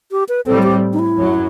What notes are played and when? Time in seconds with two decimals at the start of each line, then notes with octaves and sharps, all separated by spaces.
0.11 G4
0.29 B4
0.46 A2 G3 C4 A4
0.63 G4
0.93 D#4
0.99 E4
1.17 F#2 F#3